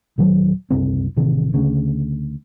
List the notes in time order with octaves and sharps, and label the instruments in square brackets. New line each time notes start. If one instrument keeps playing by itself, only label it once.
[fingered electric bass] D#1 D#3 F#3
F#1 C2 C4
A1 C3 D#3
D2 C#3